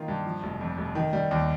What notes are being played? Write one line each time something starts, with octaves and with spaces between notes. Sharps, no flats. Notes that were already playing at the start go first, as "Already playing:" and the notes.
Already playing: D#3 A#3 F4
G2
F3
F1
F2
F1
D#3
G3
D#2